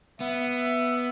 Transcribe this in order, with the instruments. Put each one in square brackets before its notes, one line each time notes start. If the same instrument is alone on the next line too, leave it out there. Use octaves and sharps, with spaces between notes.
[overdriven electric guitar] B3 [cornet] E5